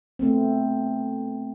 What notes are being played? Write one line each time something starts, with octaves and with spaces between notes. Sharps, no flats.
A3 B3 C4